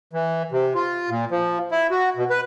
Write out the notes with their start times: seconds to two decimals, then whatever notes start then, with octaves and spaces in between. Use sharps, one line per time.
0.13 E3
0.52 C3
0.75 F4
1.10 A#2
1.31 F3
1.71 E4
1.91 F#4
2.16 B2
2.30 B4